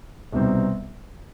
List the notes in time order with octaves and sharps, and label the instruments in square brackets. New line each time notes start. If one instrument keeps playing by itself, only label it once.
[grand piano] C2 B2 G3 C4 D#4